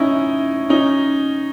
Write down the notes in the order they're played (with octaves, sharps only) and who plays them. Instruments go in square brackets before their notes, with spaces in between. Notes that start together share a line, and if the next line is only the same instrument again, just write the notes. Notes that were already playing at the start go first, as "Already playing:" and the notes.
Already playing: [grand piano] C#4 D#4 E4
C#4 D#4